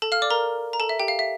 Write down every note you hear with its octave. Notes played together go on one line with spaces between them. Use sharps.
A4 A5
F5 F6
D5 D6
A#4 A#5
A#5
A4 A5
E5
G4 G5
F5
E5